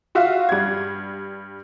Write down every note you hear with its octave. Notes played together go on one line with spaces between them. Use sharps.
F4 F#4 E5 F5
G2 G#6